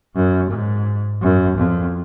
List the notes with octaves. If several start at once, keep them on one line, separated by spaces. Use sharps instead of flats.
F#2
G#2
F#2
F2